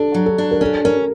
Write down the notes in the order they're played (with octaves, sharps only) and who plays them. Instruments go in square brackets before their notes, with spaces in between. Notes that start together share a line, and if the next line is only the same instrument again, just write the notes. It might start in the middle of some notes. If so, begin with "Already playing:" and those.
Already playing: [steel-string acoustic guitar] D4 [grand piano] A4
[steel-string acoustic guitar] F#3
[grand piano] A4
[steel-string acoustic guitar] D4
[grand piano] A#4
[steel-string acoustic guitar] C#4 [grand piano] A4
[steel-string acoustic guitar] C#4 [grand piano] A#4